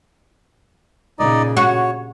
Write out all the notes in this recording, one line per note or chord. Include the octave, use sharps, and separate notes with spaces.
A#2 C#3 D#4 D5 D#5
F#4 C#5